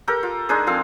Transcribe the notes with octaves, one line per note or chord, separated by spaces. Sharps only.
G4 A4 A#4 G5
F4
G#3 D4 D#4 G#4
F3 C4 A4 F5